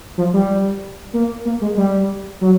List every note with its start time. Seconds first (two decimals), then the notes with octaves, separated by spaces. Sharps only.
0.18 F3
0.34 G3
1.13 A#3
1.45 A#3
1.61 G#3
1.77 G3
2.41 F#3